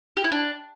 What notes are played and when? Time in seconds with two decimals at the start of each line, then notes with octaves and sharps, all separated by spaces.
0.17 G4
0.24 E4
0.32 D4